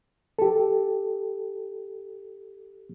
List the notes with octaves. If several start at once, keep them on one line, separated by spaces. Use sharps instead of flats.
G4 A4